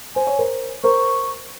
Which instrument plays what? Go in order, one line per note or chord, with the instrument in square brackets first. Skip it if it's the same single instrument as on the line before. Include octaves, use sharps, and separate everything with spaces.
[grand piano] C5 [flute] G#5
[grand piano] C#5
A#4 C5
[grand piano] A#4 C5 [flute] C#6